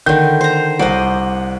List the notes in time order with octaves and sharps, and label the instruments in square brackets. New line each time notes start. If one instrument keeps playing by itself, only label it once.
[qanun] D3 D#3 [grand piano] G6
[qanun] C5 A#5
[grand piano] C2 C5 F#5 [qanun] D5 D#5